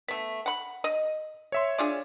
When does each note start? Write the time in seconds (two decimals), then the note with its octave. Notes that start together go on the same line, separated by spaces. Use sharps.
0.08 A3 B3 B6
0.46 F#5 B5
0.84 D#5
1.52 C#5 E5 C6
1.78 D4 F4 G#4